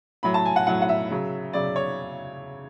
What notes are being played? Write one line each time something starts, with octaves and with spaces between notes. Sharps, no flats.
A2 F#3 B5
A5
G#5
F#5
A2 F#3 F#5
F#5
E5
C#3 F#3
C#3 F#3 D5
C#5